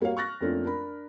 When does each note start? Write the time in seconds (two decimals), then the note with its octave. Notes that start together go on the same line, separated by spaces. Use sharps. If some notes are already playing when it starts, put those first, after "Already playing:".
0.01 G3 A#3 F#4 C#5 F5
0.17 C#6 F6 F#6 A6 A#6
0.41 F2 A3 A#3 C#4 D4 F4
0.64 D4 A#4 B5